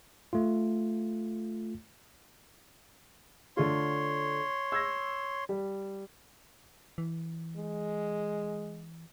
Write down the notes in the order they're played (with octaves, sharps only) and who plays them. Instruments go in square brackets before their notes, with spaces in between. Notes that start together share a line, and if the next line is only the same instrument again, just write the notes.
[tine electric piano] A3 F4
[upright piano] D3 A3 F4 [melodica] C#5 C6
[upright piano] E6 G#6 A#6
G3
[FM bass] E3
[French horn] G#3